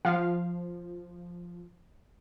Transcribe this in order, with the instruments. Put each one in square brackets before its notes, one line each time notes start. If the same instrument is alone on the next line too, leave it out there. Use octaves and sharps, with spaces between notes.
[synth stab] F3 [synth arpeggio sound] F5